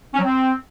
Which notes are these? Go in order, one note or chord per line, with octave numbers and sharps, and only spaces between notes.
C#4
F#3
C4